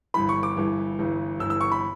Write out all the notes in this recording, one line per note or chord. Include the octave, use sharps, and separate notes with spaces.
G1 G2 E3 B5
C#6
D6
G1 G2 E3
G1 G2 E3
G1 G2 E3 E6
E6
C#6
B5